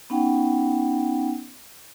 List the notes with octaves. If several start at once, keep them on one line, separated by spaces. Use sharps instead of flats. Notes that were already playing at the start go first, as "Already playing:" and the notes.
B3 C#4 D#4 F#5 G5